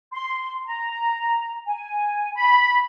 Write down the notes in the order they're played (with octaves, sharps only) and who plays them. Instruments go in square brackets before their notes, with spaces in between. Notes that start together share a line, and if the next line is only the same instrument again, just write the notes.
[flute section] C6
A#5
G#5
B5